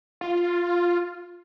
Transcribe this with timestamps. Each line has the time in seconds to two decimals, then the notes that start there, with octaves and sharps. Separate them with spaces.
0.21 F4